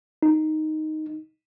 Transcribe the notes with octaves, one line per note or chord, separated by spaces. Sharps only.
D#4